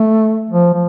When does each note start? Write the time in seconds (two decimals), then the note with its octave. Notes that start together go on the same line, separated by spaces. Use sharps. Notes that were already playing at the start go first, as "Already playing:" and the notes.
Already playing: A3
0.50 F3
0.74 F3